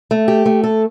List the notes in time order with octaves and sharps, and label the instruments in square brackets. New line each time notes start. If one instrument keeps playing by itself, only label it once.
[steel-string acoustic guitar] A3
G4
A3
A4